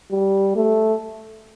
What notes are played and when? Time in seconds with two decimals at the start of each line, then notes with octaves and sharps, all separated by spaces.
0.11 G3
0.56 A3